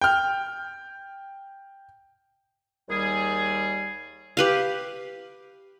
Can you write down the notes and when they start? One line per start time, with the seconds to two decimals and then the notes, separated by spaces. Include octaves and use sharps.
0.01 G5 F6
2.89 D#2 G3 G#4
4.37 G4 B4 F5